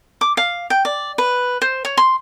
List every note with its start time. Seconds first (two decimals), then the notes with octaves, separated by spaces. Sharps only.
0.21 D6
0.37 F5
0.70 G5
0.85 D5
1.18 B4
1.62 C5
1.85 C#5
1.97 C6